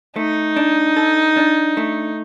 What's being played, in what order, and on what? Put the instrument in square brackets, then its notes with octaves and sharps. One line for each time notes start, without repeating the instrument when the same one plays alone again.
[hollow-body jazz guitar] A3 [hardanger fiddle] D#4
[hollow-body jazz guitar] D4
A4
D4
A3